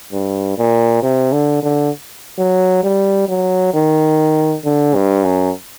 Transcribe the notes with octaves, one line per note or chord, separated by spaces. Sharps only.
G2
A#2
C3
D3
D3
F#3
G3
F#3
D#3
D3
G2
F#2